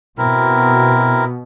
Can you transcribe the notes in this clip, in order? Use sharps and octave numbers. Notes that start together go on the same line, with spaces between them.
B2 C4 E4 A#4